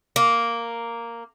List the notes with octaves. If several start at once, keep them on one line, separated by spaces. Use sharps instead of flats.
A#3